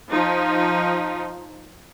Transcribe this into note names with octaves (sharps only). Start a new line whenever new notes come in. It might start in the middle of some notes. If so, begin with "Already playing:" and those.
F3 D#4